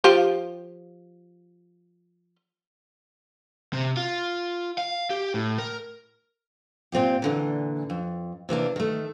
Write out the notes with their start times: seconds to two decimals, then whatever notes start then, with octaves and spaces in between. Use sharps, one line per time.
0.04 F3 F4 G4
3.73 C3
3.97 F4
4.78 F5
5.10 G4
5.34 A2
5.58 A#4
6.92 A#2 C4 F4 G4
7.22 A#2 D3 E3
7.90 F2
8.49 C3 E3 A#3 D4
8.76 D#3 A3